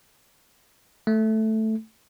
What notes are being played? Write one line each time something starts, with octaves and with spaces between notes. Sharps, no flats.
A3